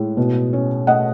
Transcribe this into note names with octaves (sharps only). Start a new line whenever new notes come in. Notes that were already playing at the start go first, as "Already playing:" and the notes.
Already playing: A2 G#3
B2
C#4
A3 D#5 F#5